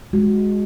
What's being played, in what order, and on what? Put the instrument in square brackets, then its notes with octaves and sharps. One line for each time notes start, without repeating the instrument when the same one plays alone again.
[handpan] G#3 F#4